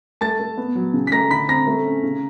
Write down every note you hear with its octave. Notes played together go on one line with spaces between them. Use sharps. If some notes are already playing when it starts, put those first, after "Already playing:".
A3 A5 A6
A3
B3
F#3
C#3
B6
A3 A#5 A#6
D3 B5 B6
C4 A#5 A#6
A3
C#4
C#3